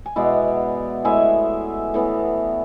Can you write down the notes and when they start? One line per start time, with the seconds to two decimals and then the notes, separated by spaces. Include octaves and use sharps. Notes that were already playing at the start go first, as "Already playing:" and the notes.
0.06 G#5
0.16 B2 G#3 B3 E4 D5 F#5
1.04 A2 G#3 B3 E4 E5 G#5
1.94 A2 E3 B3